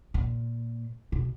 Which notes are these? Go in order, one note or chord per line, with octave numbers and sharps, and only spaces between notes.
A#2
B2